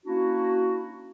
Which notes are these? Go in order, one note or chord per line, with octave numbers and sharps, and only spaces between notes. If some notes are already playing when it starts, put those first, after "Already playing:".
A#3 C#4 D4 E4 F#4